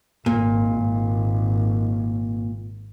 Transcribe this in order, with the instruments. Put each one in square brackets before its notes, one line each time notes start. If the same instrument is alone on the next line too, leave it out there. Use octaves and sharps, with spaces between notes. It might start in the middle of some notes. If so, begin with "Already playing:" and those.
[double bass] G#1 [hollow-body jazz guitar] A#2